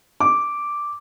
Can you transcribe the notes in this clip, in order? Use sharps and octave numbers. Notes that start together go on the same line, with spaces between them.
D6